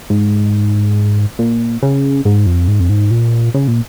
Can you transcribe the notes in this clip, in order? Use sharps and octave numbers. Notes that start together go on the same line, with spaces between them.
G#2
A#2
C#3
G#2
F2
G#2
F2
G#2
A#2
C#3
A#2